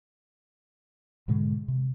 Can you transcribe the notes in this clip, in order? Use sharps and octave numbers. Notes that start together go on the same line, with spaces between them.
G#2 B2 D3 G#3
C3